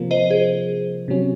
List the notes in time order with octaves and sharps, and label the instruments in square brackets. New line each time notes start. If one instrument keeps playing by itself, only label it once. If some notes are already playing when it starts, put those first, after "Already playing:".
Already playing: [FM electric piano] C3 F3 A#3
[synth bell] C5 D#5
G#4 C5
[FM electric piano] C3 F#3 C#4